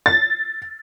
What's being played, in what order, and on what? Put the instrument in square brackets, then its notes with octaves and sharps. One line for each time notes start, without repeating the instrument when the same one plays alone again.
[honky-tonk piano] A6